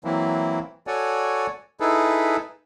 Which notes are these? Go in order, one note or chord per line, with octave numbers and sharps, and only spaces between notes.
E3 F#3 A#3 C4 E4
F#4 A4 C#5 D5 F#5 G#5
D#4 E4 G#4 A4 B4